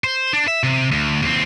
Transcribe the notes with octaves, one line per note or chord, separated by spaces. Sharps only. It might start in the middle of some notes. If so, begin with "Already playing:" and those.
C5
D4
E5
C3
D2
D#2 C4